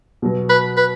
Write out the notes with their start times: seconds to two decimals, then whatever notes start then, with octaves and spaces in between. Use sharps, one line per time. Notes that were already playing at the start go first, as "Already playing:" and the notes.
0.22 B2 F#3 B3
0.50 B4
0.77 B4